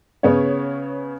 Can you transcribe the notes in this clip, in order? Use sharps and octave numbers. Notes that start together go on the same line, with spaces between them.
C#3 B3 C#5